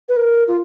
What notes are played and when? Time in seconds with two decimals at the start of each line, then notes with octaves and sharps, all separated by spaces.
0.09 B4
0.16 A#4
0.48 F4